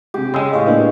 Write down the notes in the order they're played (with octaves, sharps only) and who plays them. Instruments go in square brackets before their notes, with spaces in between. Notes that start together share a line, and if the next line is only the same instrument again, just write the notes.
[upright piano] C3 G#3 [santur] G4
[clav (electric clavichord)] C#3 G#3 [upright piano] C6 D#6 E6
[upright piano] A2 C#6 [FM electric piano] D#5 F5
[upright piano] A2 [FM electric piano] A#3 D4 B4